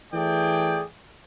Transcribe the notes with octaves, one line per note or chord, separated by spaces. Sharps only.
E3 A3 G#4 D5 G5